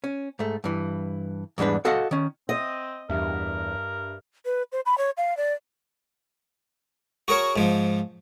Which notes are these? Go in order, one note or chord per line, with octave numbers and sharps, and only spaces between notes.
C#4
G#2 A3
G2 E3
E2 G#2 G3 D4 B4
F#4 A4 D#5 F5 F#5
D#3 C#4
C4 D#5
E2 G2 A#4 E5
B4
C5
B5
C#5
F5
D5
F#4 G#4 A#4 C#5
G#2 F3